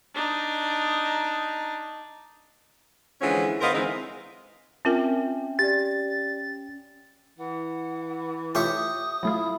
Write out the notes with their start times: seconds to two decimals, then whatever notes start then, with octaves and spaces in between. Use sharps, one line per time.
0.15 D4 D#4
3.21 D3 E3 F3 G#3 C#4 G#4
3.61 D2 B3 A#4 C5 D#5 F5
3.73 D3 E3 F3 G#3 C4 D#4
4.85 C4 C#4 F4 A#4 E5 G5 G#5 F6
5.59 G4 D5 A6
7.39 E3 F#5
8.55 A3 F4 G4 C#5 E5 D#6
9.23 F#3 A3 E4 F4